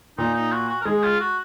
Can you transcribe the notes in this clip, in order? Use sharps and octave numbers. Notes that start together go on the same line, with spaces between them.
A#2 D#4
D#4
F#4
F#4
A#4
G#3 G#4
F4
F#4